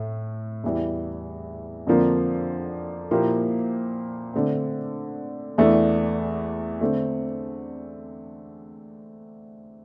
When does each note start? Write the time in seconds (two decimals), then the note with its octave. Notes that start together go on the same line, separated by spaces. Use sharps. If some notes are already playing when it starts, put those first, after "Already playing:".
Already playing: A2 A3
0.64 E2 E3 G3
1.87 F2 D3 F3 A#3
3.11 A#2 F3 A#3 E4 G4
4.34 D3 A3 C4
5.58 E2 E3 A3 D4
6.81 D3 A3 C4